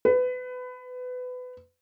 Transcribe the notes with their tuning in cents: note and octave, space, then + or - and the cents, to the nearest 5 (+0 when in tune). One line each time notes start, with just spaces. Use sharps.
B4 +25